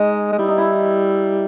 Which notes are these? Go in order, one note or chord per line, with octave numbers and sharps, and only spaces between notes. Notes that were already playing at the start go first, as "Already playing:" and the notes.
Already playing: G#3 D#4
G#3
G3 E4
D#4
E4